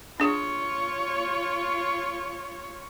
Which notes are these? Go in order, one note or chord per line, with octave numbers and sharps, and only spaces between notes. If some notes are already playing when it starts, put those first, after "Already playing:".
D4 F4 G#4 C#5